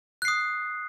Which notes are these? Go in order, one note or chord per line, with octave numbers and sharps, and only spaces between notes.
D#6 F#6 C7